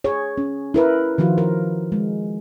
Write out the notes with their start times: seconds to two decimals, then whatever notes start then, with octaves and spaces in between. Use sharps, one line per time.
0.04 G#4 C#5
0.38 C#4
0.74 E4 A#4 B4
1.18 D#3 F3 F4 F#4
1.38 A#4
1.92 G#3